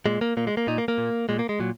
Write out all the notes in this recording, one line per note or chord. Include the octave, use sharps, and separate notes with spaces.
A#2 G#3
A#3
A#2 A#3
G#3
A#3
A#2 D#4
A#3
A#3
A#2
A#2 G#3
A#3
G#3
A#2 F#3